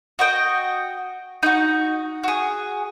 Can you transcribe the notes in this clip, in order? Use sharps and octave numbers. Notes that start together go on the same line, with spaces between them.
F#4 D#5 G5
D#4 F#4
F#4 G#4